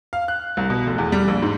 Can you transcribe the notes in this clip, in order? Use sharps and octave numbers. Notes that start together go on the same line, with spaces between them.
F5
F#6
C2
B2
F1
E2
G3
A#1
G#2